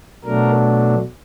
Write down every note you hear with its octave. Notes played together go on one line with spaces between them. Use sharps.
B2 F#3 A3 D4 A#4